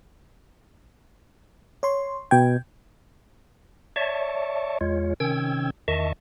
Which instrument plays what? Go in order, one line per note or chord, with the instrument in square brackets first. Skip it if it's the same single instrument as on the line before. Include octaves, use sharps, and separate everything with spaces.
[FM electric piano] C#5 C6
[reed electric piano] B2 G#6 [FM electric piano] G5
[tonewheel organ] C#5 D5 E5 A5 C#6
E2 G#3 F4 C#5
C3 D#3 C#4 G5 E6 G#6
E2 D#3 D#5 E5 A5 C#6